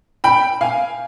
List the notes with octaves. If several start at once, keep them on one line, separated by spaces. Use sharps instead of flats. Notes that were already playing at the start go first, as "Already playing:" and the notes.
G5 B5
F5 G#5